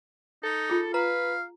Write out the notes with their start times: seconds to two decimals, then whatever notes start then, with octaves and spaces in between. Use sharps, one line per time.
0.44 D#4 A4
0.70 F4 G#4
0.94 B4 F5 A#5